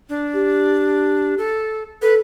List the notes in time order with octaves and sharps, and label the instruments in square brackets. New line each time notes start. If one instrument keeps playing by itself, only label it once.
[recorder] D4
[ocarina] G4
[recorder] A4
[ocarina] A4 [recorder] B4